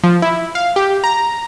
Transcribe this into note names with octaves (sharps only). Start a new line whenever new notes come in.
F3
E4
F5
G4
A#5